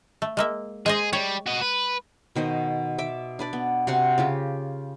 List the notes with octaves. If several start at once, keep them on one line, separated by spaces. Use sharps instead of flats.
A3
G#3 A#3 E5
G#3 G#4 C5 D#5
G3 C#5
F#4 D#5
B4
B2 D#3 C5 D#5
E5 D6
D4 B4 D5
B3
C3 F#4 F#5 C6
C#3 F4 G4